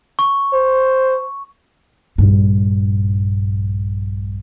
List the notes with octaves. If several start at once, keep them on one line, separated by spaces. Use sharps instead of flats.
C#6
C5
A#1 G2